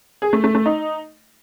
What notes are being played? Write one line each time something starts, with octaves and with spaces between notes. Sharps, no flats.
G#4
A3
A3
A3
D#4